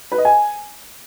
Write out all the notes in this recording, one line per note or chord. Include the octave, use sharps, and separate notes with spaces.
B4
D#5
G#5